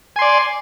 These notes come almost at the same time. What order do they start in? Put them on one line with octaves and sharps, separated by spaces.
G#5 C6 D5